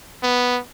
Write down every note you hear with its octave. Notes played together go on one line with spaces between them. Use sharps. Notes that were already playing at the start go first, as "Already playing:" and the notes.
B3